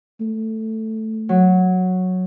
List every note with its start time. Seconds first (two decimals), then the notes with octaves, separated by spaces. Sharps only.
0.21 A3
1.29 F#3